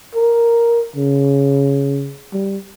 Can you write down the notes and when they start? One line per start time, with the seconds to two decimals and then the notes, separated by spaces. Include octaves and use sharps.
0.15 A#4
0.96 C#3
2.33 G3